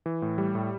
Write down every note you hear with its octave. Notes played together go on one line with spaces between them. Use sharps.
E3
A2
G3
A2